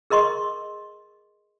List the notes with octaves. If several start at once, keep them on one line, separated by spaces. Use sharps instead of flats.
G#4 A#4 D#5 C6 C#6